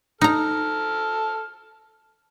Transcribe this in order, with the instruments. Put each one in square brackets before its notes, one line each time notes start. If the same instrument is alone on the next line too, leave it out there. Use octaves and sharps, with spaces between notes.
[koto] D#4 A#5 [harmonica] A4 F6